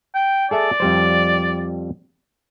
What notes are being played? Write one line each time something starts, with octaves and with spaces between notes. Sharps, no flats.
G5
G#4 A4 D5 E5
F2 G3 C5